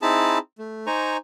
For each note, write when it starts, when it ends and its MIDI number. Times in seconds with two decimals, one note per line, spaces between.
0.02 0.38 60
0.02 0.38 63
0.02 0.38 64
0.02 0.38 68
0.02 0.38 81
0.02 0.38 83
0.58 0.86 57
0.86 1.17 63
0.86 1.17 72
0.86 1.17 80
0.86 1.17 82
0.86 1.17 85